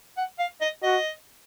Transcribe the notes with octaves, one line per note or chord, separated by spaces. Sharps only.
F#5
F5
D#5
F#4 D#5